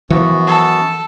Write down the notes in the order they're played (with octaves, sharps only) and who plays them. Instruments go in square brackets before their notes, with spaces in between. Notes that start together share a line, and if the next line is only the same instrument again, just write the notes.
[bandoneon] F#2 B3 F#4 [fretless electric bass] E3 F3
[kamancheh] A4